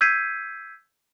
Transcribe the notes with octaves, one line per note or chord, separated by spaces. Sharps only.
E6 G6 G#6 B6 C7 D#7